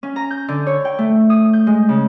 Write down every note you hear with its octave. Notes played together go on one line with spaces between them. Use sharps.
C#4
A#5
G6
D3
C#5
G5
A3
D#6
G6
G#3
C#3